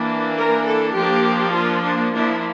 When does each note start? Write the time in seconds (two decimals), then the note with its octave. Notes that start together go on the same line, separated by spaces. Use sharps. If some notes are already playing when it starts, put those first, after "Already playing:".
Already playing: E3 A#3 D4
0.36 A#4
0.65 A4
0.95 F3 A#3 D4 G4
1.55 F4
1.85 D4
2.15 F3 A#3 D4 E4